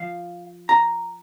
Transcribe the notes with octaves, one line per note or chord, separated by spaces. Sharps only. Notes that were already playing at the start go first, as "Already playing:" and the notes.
Already playing: F3 F5
A#5